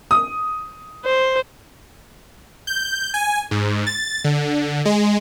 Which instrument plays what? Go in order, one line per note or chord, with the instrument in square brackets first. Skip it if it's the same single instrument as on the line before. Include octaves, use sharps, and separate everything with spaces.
[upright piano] D#6
[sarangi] C5
[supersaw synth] G6
G#5
G#2
A6
D3
G#3